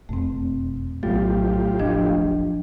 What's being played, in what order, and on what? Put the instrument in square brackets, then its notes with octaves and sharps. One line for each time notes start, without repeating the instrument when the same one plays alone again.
[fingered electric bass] E1 F2 B2 [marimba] A3 C4
[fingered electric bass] A#1 A3 [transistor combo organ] A2 F4 G4 [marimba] F#3 B3
[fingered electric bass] E1 A1 F#3 [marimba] F3 D4 D#5